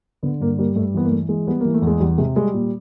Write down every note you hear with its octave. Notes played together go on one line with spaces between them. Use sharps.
D3 B3
G2 A#3
G3 A#3
G2 A3
E3 B3
A#3
E3 A3
E3 G#3
G3 B3
E3 A#3
A3
E2
G#3
E2 G3
C3 G#3
G3 G#3
A#2